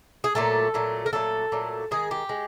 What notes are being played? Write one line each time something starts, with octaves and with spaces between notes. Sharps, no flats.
G#4
A#2 F#3 A3 A4
A#2 F#3 A3
A#4
A#2 F#3 A3 A4
A#2 F#3 A3
D#3 G#3 G#4
G4
G#3